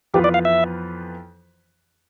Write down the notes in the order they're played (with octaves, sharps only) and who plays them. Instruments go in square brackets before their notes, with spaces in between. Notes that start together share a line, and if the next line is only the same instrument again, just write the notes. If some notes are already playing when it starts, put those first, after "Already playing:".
[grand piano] F2 E3 B3 F4 B4 [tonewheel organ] G4
[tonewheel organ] D5
F5
E5